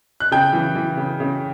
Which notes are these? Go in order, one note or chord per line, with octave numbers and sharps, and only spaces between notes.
F#6
C#3 G5 G6
E3
E3
C#3
C#3